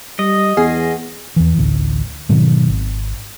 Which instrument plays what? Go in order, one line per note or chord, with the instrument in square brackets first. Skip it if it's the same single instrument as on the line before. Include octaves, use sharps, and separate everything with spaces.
[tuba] G3 [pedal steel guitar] D#5
[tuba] E2 [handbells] B3 [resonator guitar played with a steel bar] G#4
[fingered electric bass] E2 E3
A1 D2
G#2 B2 D#3 F#3
G#1